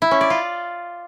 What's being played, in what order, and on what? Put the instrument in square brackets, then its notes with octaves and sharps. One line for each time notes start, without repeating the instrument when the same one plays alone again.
[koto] E4
C#4
D5
F4